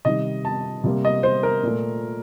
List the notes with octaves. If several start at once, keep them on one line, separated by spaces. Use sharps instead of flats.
C3 D#3 G3 D#5
A5
C3 G3 A#3
D#5
C5
A#4
A#2 A3